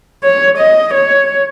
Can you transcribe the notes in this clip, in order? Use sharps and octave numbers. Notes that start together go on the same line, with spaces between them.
C#5
D#5
C#5